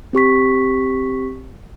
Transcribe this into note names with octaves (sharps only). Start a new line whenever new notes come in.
C4 G4 C#6 B6